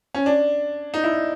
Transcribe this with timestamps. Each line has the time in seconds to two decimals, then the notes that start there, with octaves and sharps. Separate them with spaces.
0.14 C#4
0.26 D4
0.94 D#4
1.04 E4